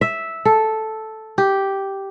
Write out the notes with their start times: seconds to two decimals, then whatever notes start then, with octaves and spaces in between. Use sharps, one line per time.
0.01 E5
0.45 A4
1.38 G4